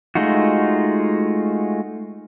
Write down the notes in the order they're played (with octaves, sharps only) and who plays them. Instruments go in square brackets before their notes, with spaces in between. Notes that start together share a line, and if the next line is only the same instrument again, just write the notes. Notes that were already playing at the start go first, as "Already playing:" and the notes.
[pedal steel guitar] G#3 A3 D#4 F4 F#4